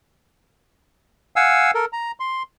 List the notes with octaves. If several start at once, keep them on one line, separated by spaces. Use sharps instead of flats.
F5 F#5 G#5 E6
A4 A#4
A#5
C6